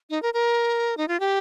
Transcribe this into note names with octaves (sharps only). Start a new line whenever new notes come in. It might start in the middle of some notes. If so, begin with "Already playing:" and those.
D#4
A#4
A#4
D#4
F4
G4